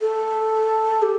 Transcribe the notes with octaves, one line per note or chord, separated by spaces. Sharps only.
A4
G4